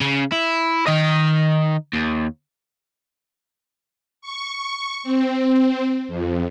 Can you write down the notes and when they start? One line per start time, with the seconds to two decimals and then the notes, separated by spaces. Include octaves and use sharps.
0.01 C#3
0.32 E4
0.87 D#3 D#5
1.94 D#2
4.21 C#6
5.03 C4
6.08 F2